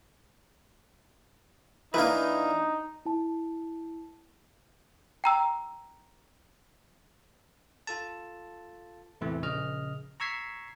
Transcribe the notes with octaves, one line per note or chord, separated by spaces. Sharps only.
E3 A#3 D4 D#4 B4
E4 A5
G5 A#5 E6
F4 A4 A5
E2 A2 C3 E3 A3
A#1 C#3 D#5 F6
A#5 C#6 E6 G#6 B6 C7